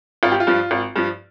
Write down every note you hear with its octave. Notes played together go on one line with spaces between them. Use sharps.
G#1 F4
G4
F4
G2 F3
G#1
G2 F3